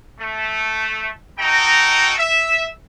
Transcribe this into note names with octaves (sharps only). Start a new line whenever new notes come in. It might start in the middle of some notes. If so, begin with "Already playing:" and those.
A3
D#4 F#4 A4 D#5 G5 A#5
E5